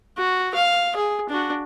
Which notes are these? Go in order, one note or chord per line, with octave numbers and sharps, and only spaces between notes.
F#4
F5
G#4
D4 F#4